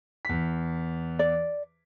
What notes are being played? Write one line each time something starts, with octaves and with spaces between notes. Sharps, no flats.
E2 B6
D5